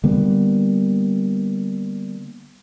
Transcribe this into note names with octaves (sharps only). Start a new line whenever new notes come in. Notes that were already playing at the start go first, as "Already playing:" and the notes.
D3 G3 A#3 B3